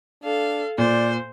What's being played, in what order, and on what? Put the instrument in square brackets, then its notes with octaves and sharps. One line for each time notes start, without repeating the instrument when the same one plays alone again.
[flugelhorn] D4 [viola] A4 F5
[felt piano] A#2 [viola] C5 [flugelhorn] D5